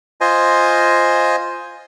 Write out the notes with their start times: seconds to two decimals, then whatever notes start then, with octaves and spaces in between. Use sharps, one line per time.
0.21 F4 C5 D#5 G#5